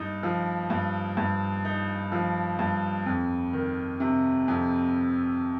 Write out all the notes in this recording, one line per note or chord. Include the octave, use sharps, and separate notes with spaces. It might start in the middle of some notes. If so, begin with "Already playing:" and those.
Already playing: G2 D#4
F3
G2
G2
D#4
F3
G2
F2
D#3
C3
F2